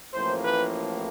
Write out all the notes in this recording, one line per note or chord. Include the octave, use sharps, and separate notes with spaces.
A1 A2 F3 A#3 C5
B4